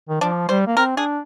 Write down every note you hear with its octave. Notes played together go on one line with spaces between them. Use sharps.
D#3
F3 D4
G3 C5
A#3
C4 A#4
D4 G#4